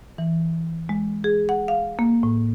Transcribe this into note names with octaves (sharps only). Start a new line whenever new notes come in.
E3
G#3
G#4
F#5
F5
A#3
A2